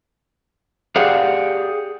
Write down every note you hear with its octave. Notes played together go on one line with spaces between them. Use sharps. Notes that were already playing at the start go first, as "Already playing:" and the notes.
G4 G#4 D5 F5 F#5